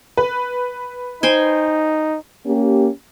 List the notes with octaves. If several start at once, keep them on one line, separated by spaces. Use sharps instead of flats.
B4
D#4 C5 G5 G#5
A#3 C#4 G4